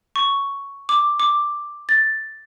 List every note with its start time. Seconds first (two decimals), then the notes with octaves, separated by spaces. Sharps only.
0.16 C#6
0.89 D6
1.20 D6
1.89 A6